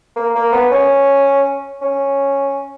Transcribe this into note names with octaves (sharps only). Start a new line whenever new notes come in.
A#3
A#3
B3
C#4
C#4